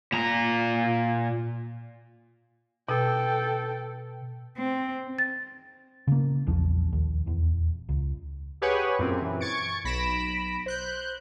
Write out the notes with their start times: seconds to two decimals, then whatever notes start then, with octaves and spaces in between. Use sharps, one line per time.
0.12 A#2 A#5
2.89 B2 A4 G5
4.58 C4
5.19 A6
6.07 C#3 A#3
6.47 A#1 E2 F3
6.92 D#2
7.26 D#1 E2
7.89 C#2
8.62 G4 G#4 B4 C#5 F#5 G#5
8.99 F#2 A#2 C4
9.22 E3
9.40 C#6 G#6 A6 C#7 D7
9.84 B1 B5 A#6 B6 D7 E7
10.66 C5 F#6 G6